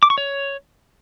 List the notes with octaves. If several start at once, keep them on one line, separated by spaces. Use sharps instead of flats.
D6
C#6
C#5